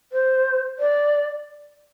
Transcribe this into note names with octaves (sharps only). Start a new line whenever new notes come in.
C5
D5